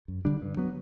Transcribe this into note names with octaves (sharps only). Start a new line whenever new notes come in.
F#2
D3 G3 D4
G2
F#3 B3